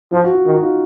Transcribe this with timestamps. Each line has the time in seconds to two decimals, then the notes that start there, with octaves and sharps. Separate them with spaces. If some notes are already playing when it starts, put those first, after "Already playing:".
0.12 F3 F4
0.24 F#4
0.35 F4
0.46 D#3 D#4
0.56 F#4
0.63 F4